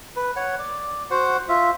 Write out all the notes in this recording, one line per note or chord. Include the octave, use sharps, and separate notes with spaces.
B4
C#5 F#5
D5
F#4 C5 F#5
F4 E5